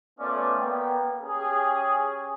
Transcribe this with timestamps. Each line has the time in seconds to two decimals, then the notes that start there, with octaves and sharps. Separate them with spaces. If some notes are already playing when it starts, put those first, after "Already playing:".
0.19 A3 B3 C#4 F4 D5
0.59 A#3 B3 G5
1.21 C#4 G4 G#4